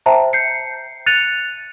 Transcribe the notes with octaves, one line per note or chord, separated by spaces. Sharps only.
C5 E5 G5 A5 A#5
G6 C7 C#7
F#6 A6 C#7 D#7 F7